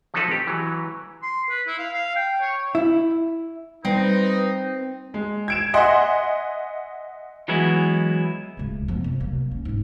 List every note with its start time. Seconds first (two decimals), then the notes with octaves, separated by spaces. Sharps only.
0.14 F3 F#3 C4 D#4 A4 B4
0.31 G4
0.47 E3 F#3
1.23 C6
1.49 B4
1.67 E4
1.79 F5
1.93 F5
2.16 G5
2.41 C#5
2.75 E4
3.85 G3 C4 D#4 B4
5.14 G#3
5.48 G#6 D7 E7
5.74 D#5 E5 F#5 G#5 C6
7.48 E3 F#3 G#3 B3 E4
8.57 D1 C#2
8.88 F2 B3
9.04 C3
9.20 F#3 A#3
9.51 C#4
9.65 G#2 B3